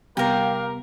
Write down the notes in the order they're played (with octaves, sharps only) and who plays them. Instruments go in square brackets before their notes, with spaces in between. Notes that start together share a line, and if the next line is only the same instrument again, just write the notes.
[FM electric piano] C3 G3 B3 [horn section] G4 A#4 [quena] F5 [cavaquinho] G5 A#5